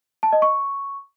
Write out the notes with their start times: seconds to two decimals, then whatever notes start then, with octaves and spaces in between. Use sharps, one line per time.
0.23 A5
0.33 D#5
0.42 C#6